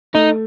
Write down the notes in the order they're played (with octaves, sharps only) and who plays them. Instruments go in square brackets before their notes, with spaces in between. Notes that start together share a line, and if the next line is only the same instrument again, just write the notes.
[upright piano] A3 [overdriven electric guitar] D#4